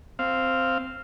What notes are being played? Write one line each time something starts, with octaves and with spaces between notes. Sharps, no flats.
C4 F5